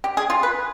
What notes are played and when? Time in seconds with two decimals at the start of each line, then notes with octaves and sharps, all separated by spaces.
0.04 G4
0.17 G#4
0.30 F4
0.43 B4